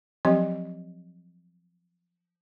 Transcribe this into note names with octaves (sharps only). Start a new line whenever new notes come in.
F3 F#3 C4 G4 C#5 D#5